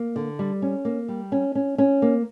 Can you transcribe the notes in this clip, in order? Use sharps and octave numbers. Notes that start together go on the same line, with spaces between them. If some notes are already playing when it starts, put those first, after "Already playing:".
Already playing: A#3
D3
G3
C#4
A#3
G3
C#4
C#4
C#4
A#3